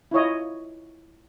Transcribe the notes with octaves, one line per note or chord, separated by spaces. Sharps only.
E4 F4 C#5 D#5